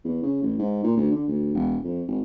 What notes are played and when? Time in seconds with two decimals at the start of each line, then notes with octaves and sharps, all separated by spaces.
0.04 E2
0.23 C#3
0.42 A1
0.59 G#2
0.84 A#2
0.97 D2
1.12 D3
1.28 D2
1.54 E1
1.84 F2
2.08 G#1